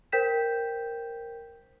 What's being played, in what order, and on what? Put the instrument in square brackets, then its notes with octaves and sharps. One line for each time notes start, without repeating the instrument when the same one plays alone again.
[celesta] A#4 C5 G5 G6 B6 E7